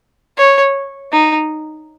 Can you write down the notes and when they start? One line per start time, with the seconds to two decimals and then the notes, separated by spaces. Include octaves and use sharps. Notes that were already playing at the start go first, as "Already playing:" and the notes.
0.38 C#5
1.12 D#4